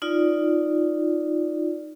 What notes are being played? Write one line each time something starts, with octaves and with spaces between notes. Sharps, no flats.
D#4 F4 D5